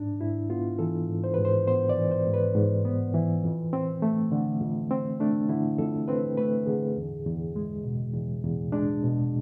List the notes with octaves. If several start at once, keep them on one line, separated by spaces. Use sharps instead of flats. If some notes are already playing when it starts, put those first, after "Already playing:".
Already playing: G#2 D4
G#2 E4
B3 F4
E3 A4
G#2
C5
G#2 B4
C5
B3 C5
D5
E3
C5
G#2
B4
G#2
B3
E3
F2
C4
A3
D3
F2
C4
A3 D4
D3 E4
F2 A4
C4 B4
A3 B4
D3 G#4
E2
E2
G#3
B2
E2
E2
G#3 D4
B2